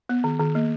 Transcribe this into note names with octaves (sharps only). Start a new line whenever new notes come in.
B3
D#3
D#3
A#3